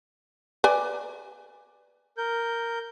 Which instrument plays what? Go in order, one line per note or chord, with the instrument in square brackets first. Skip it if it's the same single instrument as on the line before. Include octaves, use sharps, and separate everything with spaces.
[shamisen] B4 D5 G#5
[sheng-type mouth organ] A#4 G6